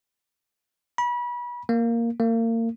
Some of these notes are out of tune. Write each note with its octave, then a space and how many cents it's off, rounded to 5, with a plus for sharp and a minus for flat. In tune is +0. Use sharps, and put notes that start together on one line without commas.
B5 -30
A#3 -5
A#3 -35